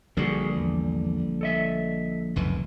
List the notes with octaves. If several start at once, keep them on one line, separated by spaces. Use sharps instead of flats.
A#1 D3 G3 F#4 G#4 A#4
E2
A4 D#5 E5
F1 C#2 F#2 E3